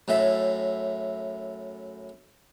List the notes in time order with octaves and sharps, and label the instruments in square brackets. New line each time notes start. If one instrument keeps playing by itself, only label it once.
[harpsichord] F#2 A2 E5